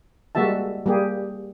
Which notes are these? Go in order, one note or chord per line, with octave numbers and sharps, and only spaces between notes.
G3 G#3 A#3 F#4 E5 A5
G3 A#3 G4 G#4